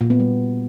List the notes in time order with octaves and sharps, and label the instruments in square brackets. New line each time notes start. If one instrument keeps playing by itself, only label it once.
[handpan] A#2
B3
G3